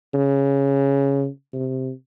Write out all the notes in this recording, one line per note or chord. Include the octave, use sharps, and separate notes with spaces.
C#3
C3